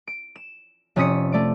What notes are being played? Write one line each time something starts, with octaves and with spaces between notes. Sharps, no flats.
D7
E7
F1 C3 C#4 D#6 B6 C#7
A3 D5 D7